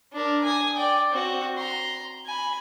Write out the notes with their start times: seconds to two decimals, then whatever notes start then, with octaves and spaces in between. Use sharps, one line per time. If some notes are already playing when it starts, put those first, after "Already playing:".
0.12 D4 A#4
0.44 G#5 D#6
0.76 D5 G5
1.11 C4 F#4
1.57 A#5 C6
2.26 G#5 B5